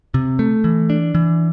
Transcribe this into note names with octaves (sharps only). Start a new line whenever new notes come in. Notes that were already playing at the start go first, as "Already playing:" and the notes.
C3
A3
E3
D4
E3